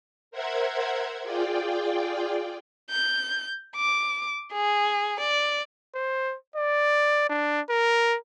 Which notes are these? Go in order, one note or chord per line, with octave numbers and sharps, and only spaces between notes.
A#4 C5 E5 F#5 G#6
F4 G#4 D5 G5
G6
D6
G#4
D5
C5
D5
D4
A#4